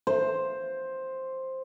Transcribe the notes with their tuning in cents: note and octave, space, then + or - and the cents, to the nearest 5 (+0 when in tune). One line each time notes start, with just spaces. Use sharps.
C5 +5